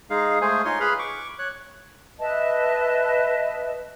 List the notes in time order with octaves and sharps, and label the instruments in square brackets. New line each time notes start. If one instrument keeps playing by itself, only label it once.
[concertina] G#3 D#4 G#4 F5
G#3 A3 G#4 C5 G#5
D#4 F4 C#5 C6
G#4 B4 B5 F6
C#6 D6
C#5 F#6
[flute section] B4 D#5 E5 A5